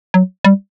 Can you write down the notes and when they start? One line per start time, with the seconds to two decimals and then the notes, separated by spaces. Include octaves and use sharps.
0.14 F#3
0.45 G3